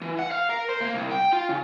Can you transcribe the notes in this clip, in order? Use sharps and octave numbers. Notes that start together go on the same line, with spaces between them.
E3
F#5
F5
A#4
C5
A#3
C2
G5
F4
C#3